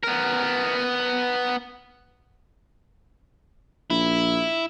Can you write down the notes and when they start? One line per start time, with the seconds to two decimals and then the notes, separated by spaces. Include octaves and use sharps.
0.03 B3 A#4
3.90 A#1 E4